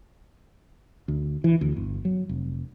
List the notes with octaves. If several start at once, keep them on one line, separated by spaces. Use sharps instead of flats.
D2
E3
D2
G1
F#3
F1